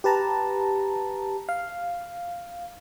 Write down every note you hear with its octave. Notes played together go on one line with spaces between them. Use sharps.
G4 B4 A5 A#5
F5